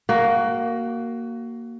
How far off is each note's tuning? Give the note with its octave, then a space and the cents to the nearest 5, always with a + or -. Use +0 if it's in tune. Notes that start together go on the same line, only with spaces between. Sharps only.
A#3 +0 F#4 +20